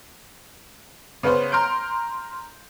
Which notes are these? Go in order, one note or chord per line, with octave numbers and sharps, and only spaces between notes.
C#3 B3 C#4 B4 C5
A#5 C6 F6 G6 D7